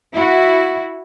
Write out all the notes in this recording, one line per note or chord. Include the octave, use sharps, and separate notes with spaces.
E4 F#4